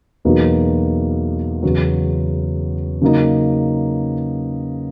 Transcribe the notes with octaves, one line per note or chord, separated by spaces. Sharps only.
E2 B2 F#3 A#3 D#4
E2 C#3 F#3
C#3 F#3 A#3 D#4